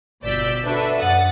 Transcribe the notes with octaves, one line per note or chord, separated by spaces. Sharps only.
G1 B2 D5 E6 G6 B6
D4 F#4 A4 B4 E5
F#2 F#5 D#6 A6